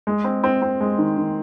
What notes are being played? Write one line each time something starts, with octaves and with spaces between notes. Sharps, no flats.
G#3
C4
C4
C4
G#3
D#3
D#3